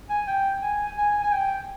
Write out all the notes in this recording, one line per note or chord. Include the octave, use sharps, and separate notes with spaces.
G#5
G5
G#5
G#5
G#5
G5